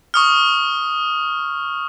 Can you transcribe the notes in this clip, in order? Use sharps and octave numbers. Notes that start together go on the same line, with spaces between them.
C#6 D#6 F6